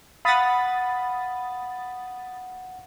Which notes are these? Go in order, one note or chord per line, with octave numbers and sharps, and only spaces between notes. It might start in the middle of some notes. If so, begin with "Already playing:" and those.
F5 F#5 B5 D#6 A6